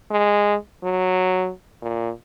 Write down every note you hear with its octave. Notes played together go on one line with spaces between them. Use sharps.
G#3
F#3
A#2